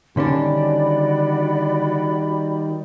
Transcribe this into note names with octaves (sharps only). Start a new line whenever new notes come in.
D3 D#3 G3 C#4 D4 F#4 D5 B5